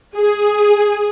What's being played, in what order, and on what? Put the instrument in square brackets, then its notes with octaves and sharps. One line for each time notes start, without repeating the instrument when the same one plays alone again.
[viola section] G#4